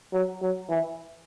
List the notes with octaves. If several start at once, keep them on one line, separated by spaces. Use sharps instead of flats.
F#3
F#3
E3